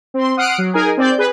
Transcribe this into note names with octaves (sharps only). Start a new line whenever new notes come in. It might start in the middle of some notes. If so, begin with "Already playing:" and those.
C4 C6
F#5 D#6 F6 F#6 C7 D7
F#3
D#4 G#4 A#4 G#5
C4 D5 G6
G#4 B4